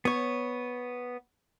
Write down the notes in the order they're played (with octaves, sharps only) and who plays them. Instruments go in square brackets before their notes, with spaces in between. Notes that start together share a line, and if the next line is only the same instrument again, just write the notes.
[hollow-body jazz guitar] B3 C#5